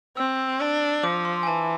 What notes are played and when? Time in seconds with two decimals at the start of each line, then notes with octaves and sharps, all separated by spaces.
0.17 C4 E6
0.60 D4
1.04 F3 D6
1.25 C6
1.43 G#5
1.47 E3 A5